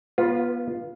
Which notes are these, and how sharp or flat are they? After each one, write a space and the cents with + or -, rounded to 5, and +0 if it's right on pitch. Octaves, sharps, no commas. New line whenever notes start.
B3 -30 F4 +0 B4 +0